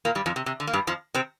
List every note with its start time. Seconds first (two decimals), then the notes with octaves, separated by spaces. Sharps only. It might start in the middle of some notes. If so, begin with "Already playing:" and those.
0.05 A#2 A#3
0.15 G2 G3
0.26 F2 F3
0.36 C3
0.46 C3
0.60 D3
0.67 A#3
0.73 G2 G3
0.87 F2 F3
1.14 C3 C4